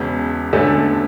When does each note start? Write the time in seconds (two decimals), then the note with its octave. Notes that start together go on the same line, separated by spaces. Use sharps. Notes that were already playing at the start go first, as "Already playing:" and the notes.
Already playing: E1 E2 C#3
0.53 E1 D2 D3 A3 C#4